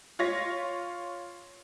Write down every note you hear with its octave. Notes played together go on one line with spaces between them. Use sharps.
F4 C#5 A#6